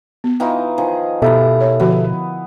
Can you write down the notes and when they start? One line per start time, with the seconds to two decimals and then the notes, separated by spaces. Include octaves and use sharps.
0.24 B3
0.40 E3 D#4 F4 G5
0.78 D#3 F3 G#4
1.22 B2 E4 G4 A4 A#4 E5 A#5
1.61 C#5
1.80 D3 F3 B3 F#4